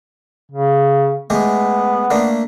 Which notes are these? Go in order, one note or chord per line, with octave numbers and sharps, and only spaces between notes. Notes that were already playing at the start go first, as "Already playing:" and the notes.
C#3
G#3 A3 B3 G4
A3 A#3 D4